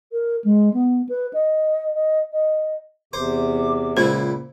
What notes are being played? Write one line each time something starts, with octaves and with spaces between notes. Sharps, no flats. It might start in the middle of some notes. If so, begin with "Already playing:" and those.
A#4
G#3
B3
B4
D#5
D#5
D#5
E2 C3 C5 D6
C#2 A#2 E4 C5